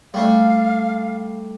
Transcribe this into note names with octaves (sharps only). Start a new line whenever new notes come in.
G3 A3 D4 F5